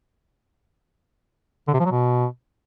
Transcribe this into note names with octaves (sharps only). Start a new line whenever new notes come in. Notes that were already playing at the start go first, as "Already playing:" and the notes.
D3
C3
F3
F#3
B2